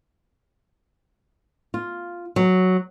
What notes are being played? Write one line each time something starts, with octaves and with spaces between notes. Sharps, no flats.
F4
F#3